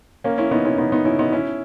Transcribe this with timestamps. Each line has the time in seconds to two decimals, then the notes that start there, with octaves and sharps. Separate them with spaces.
0.24 A#3 C#4
0.38 C#4 E4
0.51 B3 D#4
0.65 C#4 E4
0.78 B3 D#4
0.92 B3 D#4
1.05 C#4 E4
1.19 B3 D#4
1.32 C#4 E4